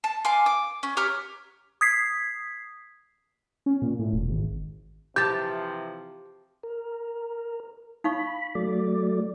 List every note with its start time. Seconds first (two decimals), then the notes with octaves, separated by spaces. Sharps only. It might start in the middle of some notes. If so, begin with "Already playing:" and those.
0.04 A5
0.25 F5 G#5 C6 D6
0.46 D6
0.83 C#4
0.97 G4 C#5 A#5 F6
1.81 D#6 G#6 B6 C7
3.66 C#4
3.82 A#2
3.99 A2
4.13 E1
4.29 G#1
5.16 C3 E3 F3 G4 A5 G6 A6
6.63 A#4
8.04 D#4 F5 B5 C#6
8.55 F#3 A3 D5